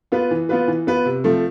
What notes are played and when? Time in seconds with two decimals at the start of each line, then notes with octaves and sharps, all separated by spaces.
0.12 B3 F4 B4
0.31 E3
0.49 B3 F4 B4
0.68 E3
0.87 B3 F4 B4
1.06 C3
1.24 F3 A3 C4